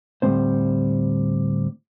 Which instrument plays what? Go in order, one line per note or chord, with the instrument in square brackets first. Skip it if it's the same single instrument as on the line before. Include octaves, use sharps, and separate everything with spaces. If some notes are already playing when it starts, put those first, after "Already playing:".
[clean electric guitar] D2 A2 G3 G#3 C4 C5